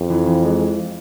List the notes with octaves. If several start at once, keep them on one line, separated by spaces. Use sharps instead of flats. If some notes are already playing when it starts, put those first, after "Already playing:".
Already playing: F2
E3
E3
G#3